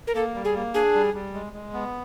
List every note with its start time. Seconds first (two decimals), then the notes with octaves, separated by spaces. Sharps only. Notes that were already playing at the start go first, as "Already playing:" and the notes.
0.07 A#4
0.15 A#3 A4
0.35 G3
0.45 G#4
0.55 A#3
0.74 D4 G#4
0.94 G3
1.14 G3
1.34 G#3
1.53 G#3
1.74 B3